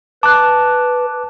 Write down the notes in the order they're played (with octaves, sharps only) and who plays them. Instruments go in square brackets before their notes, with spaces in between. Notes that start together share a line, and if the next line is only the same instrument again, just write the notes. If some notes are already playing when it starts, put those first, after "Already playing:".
[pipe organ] B4 [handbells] A5 [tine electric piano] D6 F#6